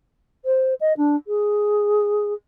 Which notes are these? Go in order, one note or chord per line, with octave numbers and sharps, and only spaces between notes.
C5
D#5
D4
G#4